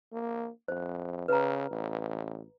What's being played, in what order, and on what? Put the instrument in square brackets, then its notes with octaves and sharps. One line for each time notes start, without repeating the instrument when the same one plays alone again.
[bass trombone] A#3
[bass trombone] F2 [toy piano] C5
[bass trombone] C#3 [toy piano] B4 A#5
[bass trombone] A1